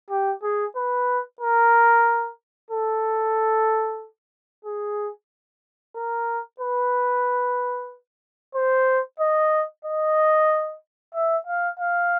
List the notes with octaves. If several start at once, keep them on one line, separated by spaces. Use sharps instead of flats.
G4
G#4
B4
A#4
A4
G#4
A#4
B4
C5
D#5
D#5
E5
F5
F5